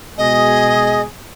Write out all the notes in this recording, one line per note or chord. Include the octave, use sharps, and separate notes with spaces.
B2 G#3 G#4 D#5